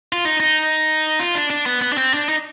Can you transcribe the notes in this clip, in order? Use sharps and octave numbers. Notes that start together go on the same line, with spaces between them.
F4
D#4
D#4
F4
D4
D4
B3
B3
D4
C4
D4
D#4